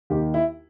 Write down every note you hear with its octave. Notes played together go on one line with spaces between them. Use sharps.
D#2 D#3 G4
E4